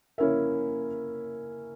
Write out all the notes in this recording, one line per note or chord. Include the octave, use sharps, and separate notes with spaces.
A#3 C#4 E4 A#4 E5